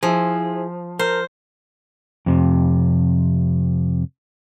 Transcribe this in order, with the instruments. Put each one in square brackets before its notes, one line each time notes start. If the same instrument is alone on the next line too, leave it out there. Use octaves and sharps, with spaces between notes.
[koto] F3 [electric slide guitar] E4 G#4
[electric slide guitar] A#4 [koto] C5
[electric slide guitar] F2 C3